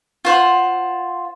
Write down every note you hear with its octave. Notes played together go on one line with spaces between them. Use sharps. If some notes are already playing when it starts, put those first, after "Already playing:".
F4 C5 F#5